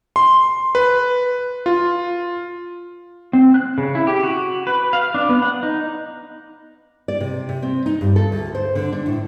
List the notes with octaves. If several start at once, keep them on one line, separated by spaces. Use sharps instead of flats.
C6
B4
F4
C4
F#6
C#3
E4
G4
F#4
B4
F5
D4
B3
F#5
D#4
D5
C3
C3
C4
D#4
G2
A4
D2
C5
D3
D4
A2